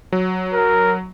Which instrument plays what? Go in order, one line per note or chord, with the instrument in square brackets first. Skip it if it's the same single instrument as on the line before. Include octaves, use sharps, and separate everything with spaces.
[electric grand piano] F#3
[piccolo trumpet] A#4